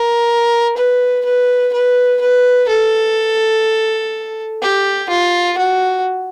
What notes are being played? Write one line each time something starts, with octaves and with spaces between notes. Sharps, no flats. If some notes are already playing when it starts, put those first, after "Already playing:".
Already playing: A#4
B4
B4
B4
B4
A4
G4
F4
F#4